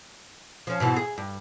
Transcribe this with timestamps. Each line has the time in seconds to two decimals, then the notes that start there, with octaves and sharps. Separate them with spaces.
0.67 F3 C#4
0.80 G#2 B2 E3
0.96 G#4
1.18 G2